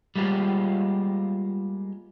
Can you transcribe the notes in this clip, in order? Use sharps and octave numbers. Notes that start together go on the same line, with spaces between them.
G3 G#3 A#3 F4